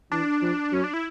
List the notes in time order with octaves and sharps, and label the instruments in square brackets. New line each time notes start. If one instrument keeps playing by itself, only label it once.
[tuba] E3 [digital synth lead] D4
[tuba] F3
[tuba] F#3 [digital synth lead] C#4
[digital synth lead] D4
E4